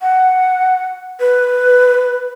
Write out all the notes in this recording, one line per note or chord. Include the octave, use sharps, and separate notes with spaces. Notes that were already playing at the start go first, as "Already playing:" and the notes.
F#5
B4